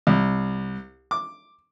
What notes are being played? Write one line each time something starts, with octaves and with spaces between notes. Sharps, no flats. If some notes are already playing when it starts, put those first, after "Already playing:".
C2
D6